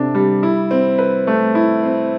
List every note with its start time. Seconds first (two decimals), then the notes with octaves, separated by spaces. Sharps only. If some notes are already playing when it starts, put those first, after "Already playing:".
Already playing: C3 D4 A4
0.15 G3
0.43 E4
0.71 C4
0.99 B4
1.27 A3
1.55 E4
1.83 C4